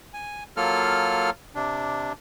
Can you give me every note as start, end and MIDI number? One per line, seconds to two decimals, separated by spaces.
0.14 0.43 80
0.57 1.30 54
0.57 1.30 58
0.57 1.30 65
0.57 1.30 69
0.57 1.30 89
1.55 2.12 48
1.55 2.12 62